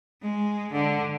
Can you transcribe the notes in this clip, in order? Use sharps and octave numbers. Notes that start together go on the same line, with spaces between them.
G#3
D3